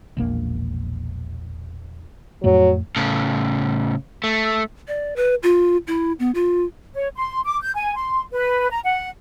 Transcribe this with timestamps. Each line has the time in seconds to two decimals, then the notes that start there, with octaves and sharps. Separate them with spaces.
0.17 E1 A#1 A#3
2.44 F2 A2 F#3 A3
2.96 A2 C#3
4.24 A3
4.88 D5
5.16 B4
5.43 F4
5.87 E4
6.19 B3
6.35 F4
6.93 C#5
7.16 C6
7.44 D6
7.61 G6
7.75 G#5
7.95 C6
8.33 B4
8.71 A#5
8.84 F#5